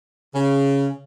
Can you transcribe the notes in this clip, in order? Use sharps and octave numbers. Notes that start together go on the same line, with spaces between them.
C#3